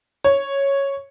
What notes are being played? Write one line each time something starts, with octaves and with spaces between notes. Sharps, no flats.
C#5